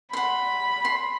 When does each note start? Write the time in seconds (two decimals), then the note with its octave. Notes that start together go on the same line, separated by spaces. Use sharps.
0.13 F#5 B5 C6
0.85 C6